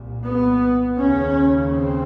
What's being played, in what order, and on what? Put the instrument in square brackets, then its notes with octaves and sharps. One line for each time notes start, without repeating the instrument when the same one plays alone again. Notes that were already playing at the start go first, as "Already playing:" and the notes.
Already playing: [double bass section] C2 A#2
B3
D#2 C#3 C#4
C4